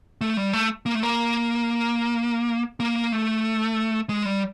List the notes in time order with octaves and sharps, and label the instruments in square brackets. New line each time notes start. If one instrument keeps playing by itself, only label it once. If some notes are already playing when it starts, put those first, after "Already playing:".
[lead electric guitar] A3
G3
A3
A#3
A3
A#3
A#3
A3
G#3
G3